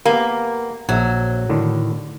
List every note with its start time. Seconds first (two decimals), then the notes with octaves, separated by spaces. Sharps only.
0.05 A#3 B3 G4
0.89 A#1 F#3 E5
1.49 A2 D3 D#3